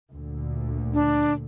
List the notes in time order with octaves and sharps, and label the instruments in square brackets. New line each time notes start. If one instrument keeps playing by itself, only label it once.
[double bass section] D2 A#2 D3
[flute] D4